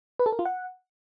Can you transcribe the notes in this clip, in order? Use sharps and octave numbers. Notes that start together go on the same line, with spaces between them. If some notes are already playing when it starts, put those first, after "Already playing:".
B4
A4
A#4
F4
F#5